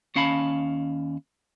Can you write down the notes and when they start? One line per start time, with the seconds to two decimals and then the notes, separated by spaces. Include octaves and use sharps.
0.16 D#2 C#4 F5 A5 B5